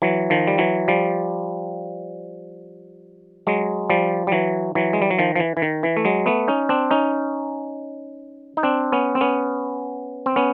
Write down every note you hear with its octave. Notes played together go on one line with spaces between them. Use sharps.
E3 F#3
D#3 F3
G3
E3 F#3
F3 G3
F#3 G#3
F3 G3
G3
E3 F#3
E3 F#3
G#3
G3
F#3
D#3 F3
F3
E3
E3
D#3
E3
A3
F#3 G#3
A3 B3
C#4 D#4
C4 D4
C#4 D#4
D#4
C4 D4
B3 C#4
C4
B3 C#4
C4
B3 C#4